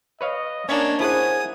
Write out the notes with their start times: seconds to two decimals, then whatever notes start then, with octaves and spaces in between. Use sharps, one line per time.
0.21 B4 C#5 D#5 F5
0.69 A#3 C#4 D4 C#5
1.00 E4 G#4 C5 F#5 G#5 D#6